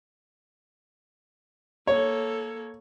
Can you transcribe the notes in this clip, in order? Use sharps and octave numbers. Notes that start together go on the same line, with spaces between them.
A#3 A4 C#5